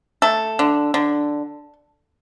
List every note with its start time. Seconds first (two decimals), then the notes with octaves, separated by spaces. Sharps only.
0.22 A3 A4
0.59 D3
0.94 D3